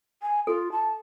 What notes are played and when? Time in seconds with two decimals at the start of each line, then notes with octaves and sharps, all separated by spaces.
0.22 G#5
0.47 F4 A4
0.72 A5